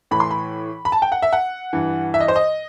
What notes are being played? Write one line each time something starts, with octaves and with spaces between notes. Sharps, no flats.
A2 E3 B5
C6
B5
B5
A5
G5
F#5
E5
F#5
G2 E3
E5
D#5
C5
D#5